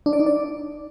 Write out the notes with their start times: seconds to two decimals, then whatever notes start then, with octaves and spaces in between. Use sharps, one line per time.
0.06 D4
0.13 D5
0.20 D#4
0.26 D5